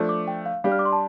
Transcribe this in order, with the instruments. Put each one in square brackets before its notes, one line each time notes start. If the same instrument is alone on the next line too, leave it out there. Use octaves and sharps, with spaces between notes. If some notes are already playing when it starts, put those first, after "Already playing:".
Already playing: [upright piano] F3 A3 D4
[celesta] D6
G5
F5
[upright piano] G3 D4 G4 [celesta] F5
[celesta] F6
D6
C6
A5